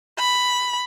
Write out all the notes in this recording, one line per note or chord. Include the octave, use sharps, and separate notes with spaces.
B5